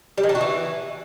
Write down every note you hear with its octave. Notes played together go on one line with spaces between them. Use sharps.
G3
D#3
D4
F#4
E3